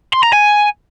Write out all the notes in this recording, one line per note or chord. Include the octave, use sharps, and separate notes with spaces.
C6
A#5
G#5